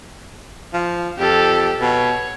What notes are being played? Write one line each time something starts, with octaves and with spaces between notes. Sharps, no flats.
F3
F2 G4 A4
B2 C#5